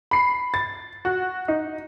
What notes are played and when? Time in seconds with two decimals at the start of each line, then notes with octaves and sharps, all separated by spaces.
0.11 B5 C7
0.54 A6
1.05 F#4
1.48 D#4